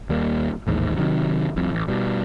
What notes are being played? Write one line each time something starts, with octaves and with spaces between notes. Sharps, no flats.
D#2 G3 A#3
A1 D#2 G#2
C3 D#3 F#3
F1 C2 F2
A1
B2 G3